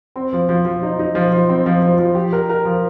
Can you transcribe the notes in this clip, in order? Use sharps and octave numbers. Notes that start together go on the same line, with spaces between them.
C4
F3
F3
F3
D#4
D#4
F3
F3
C4
F3
F3
F3
G4
A#4
A#4
F3